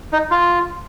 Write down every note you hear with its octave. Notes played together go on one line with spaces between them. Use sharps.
D#4
F4